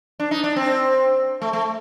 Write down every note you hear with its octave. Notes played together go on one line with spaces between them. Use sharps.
D4
D#4
D4
C4
A3
A3